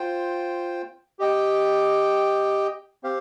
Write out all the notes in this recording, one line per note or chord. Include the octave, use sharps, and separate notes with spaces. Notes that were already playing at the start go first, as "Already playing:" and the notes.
Already playing: F4 C5 G5
G4 D#5 G5
C4 G4 C5 F5